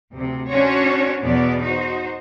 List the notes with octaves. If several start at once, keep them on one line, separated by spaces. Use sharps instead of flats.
D2 C3
C#4 D4 F#4 C5 C#5
E2 B2 B3 D5
D#4 F#4 C5